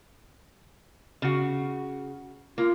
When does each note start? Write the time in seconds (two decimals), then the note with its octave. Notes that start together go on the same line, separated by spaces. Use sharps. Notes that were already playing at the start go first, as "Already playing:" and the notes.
1.22 C#3 F#4
2.58 A#3 F4